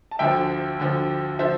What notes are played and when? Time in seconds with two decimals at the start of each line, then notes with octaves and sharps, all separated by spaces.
0.11 A5
0.19 D2 D3 F3 E5 G5
0.79 D2 D3 F3
1.39 D3 F3 C5 E5